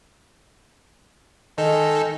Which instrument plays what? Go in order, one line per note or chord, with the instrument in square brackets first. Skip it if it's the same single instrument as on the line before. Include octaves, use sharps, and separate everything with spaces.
[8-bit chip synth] D#3 D#4 A4 [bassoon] G#3